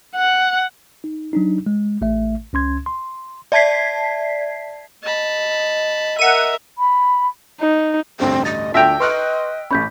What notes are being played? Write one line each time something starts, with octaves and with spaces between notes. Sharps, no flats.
F#5
D#4
F#3 D4 D#4
G#3
A1 A3 E5
C#2 C#4 C6 G#6
C6
D5 E5 A5 G#6 B6 C7
D#5 A5 B5
A#4 E5 F#5 D#7
B5
D#4
A1 D2 G2 C4
D#5 A6
D2 D4 F4 E5 G5 A#6 F7
B4 D#5 C6 C#6 F6 F#6
A1 C#4 B5 G6 B6